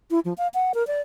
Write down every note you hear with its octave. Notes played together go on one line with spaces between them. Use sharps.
E4
F3
F5
F#5
A#4
D5